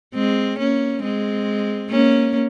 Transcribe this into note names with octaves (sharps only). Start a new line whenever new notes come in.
G#3 C4
A#3 C#4
G#3 C4
A#3 C#4